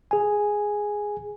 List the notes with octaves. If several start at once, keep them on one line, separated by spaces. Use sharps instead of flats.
G#4 G#5